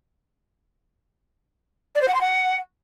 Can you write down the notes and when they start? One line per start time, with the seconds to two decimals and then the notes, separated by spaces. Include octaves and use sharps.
1.95 D5
2.02 C5
2.08 F#5
2.14 C6
2.21 F#5